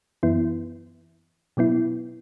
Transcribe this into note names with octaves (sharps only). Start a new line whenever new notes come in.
F#2 E3 B3 E4
B2 F#3 B3 E4